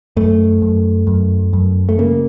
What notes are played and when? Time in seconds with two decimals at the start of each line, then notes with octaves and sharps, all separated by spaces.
0.17 F#2 A3
0.62 F#2
1.07 F#2
1.53 F#2
1.89 A3
1.98 C#3 A#3